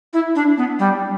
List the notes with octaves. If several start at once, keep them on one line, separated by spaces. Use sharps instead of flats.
E4
D4
B3
G3